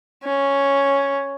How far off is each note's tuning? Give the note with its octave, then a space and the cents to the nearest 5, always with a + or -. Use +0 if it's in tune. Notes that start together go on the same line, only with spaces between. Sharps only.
C#4 +0